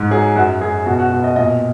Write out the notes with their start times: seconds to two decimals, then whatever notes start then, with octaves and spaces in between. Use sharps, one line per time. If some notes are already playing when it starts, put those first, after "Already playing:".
Already playing: G#2
0.11 F#3 G#4
0.36 F#2 F#4
0.61 F#2 G#4
0.86 B2 F#4
0.99 F#4
1.11 B2 F#4
1.24 D#5
1.36 A#2 D#5